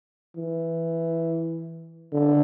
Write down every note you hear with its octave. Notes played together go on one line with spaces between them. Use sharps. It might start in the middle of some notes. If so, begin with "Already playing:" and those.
E3
D3